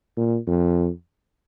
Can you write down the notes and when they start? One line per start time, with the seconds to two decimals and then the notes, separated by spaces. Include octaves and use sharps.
0.17 A#2
0.47 F2